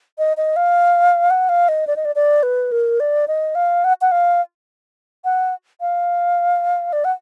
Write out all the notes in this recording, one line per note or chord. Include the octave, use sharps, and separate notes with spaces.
D#5
D#5
F5
F#5
F5
D#5
D5
D#5
D5
D5
B4
A#4
D5
D#5
F5
F#5
F#5
F5
F#5
F5
D5
F#5